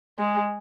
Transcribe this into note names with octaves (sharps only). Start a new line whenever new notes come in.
G#3